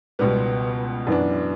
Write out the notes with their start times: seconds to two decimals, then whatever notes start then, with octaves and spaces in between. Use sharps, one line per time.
0.19 C#2 B2 G3 B3
1.07 F#2 E3 B3 D4